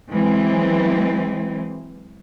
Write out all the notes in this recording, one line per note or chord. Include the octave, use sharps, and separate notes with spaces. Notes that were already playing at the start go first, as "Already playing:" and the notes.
E3 F#3 G#3 C4